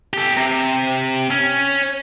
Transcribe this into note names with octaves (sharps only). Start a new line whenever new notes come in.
G4 A4
C3
C#4